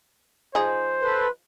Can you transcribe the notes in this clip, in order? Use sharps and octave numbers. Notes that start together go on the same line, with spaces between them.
F3 D#4 G#4 C5
A4 B4 C6